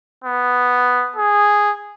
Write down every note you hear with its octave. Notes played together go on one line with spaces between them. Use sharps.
B3
G#4